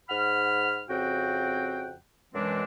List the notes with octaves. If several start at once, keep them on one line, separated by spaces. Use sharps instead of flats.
G#2 F#5 B5 F6
F2 C#3 C4 F#4 F#5 G5
F#2 B2 E3 G#3 C4 D4